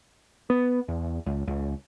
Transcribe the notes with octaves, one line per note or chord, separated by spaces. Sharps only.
B3
E2
C#2
C#2